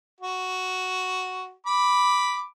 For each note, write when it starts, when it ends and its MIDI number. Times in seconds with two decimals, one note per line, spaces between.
0.21 1.52 66
1.66 2.44 83
1.66 2.44 86